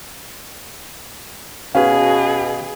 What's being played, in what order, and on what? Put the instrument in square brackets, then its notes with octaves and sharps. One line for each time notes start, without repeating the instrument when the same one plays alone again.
[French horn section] B2 [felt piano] C#4 F#4 B4 [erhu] G#4 [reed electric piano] F5